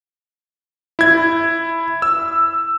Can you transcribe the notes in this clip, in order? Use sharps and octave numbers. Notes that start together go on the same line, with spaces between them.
E4 G#6
E6